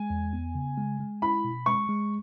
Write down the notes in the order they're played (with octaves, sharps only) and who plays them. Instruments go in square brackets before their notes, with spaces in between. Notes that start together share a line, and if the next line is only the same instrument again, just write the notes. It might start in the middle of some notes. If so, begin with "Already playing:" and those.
Already playing: [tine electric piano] G#3 [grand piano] G#5
[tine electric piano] E2
B3
C#3
G#3
G#3
[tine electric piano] E4 [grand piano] B5
[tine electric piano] B2
[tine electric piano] G#3 [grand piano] C#6
[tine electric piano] G#3